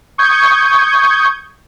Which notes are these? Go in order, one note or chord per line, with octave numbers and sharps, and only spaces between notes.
C#6 D#6 G6 G#6